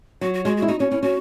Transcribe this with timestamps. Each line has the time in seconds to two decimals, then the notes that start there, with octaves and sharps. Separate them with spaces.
0.21 F#3 F#4
0.34 F#4
0.45 G#3 F#4
0.57 F#4
0.62 E4
0.68 D#4 F#4
0.80 C#4 F#4
0.91 C#4 E4
1.03 C#4 F#4